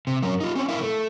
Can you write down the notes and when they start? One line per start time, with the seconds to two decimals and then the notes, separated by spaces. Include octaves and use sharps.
0.07 C3
0.22 F#2 F#3 C#4 A#4
0.40 D#4 F4
0.55 C4 C#4
0.69 E4 A#4 E5 F5
0.81 A3